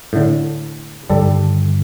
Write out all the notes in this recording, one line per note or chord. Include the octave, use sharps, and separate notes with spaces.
A2 D3
G2 D3 D#3 G3 A4